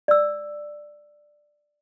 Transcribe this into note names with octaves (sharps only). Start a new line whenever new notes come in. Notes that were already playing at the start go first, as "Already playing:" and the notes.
D5 E6